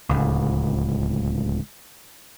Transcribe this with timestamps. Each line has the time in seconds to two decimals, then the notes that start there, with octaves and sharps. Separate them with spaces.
0.10 D1 C#2